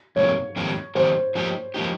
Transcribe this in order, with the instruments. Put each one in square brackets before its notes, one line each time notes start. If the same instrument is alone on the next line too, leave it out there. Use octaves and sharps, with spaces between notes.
[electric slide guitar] F2 C3 G3 A#3 [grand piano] C#5
[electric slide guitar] F2 C3 D#3 G3 A#3
[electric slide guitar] F2 C3 D#3 G3 A#3 [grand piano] C5
[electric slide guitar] F3 A#3 D#4 G4
F3 A#3 D#4 G4